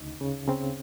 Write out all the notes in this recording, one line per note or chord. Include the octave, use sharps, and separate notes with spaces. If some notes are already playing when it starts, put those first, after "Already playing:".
Already playing: D2 C#3 D#4
C#3
C#3 C4